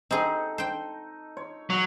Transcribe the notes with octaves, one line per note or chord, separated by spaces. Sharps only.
C4 D#4 G#4 A4
C5 G5
C#5
F#3